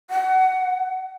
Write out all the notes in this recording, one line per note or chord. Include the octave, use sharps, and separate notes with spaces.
F#5